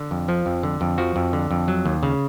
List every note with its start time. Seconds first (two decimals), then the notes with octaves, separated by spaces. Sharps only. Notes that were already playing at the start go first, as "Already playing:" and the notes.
Already playing: D3
0.11 F2
0.28 F3
0.46 F2
0.63 D3
0.81 F2
0.98 F3 F#4
1.16 F2
1.33 D3
1.51 F2
1.68 F#3
1.86 D#2
2.03 C#3